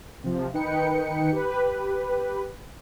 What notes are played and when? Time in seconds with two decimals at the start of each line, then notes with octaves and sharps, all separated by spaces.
0.24 C3 F3
0.54 D#3 D#4 B4 G5 C#7
1.32 G4 B4